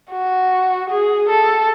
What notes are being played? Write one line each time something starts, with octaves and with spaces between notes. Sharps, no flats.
F#4
G#4
A4